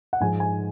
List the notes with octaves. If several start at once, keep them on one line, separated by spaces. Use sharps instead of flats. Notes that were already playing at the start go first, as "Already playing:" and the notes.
F#5
G#2 F3 G#3 G#5
G#5